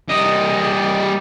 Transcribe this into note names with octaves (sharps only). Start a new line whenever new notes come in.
G3 D#5